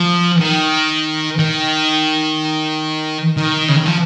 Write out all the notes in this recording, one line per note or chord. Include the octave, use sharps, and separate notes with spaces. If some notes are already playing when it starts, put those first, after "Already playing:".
Already playing: F3
D#3
D#3
D#3
C#3
D#3
F3